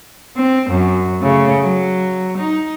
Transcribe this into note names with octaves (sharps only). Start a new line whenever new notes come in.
C4
F#2
C#3 A3
F#3
D#4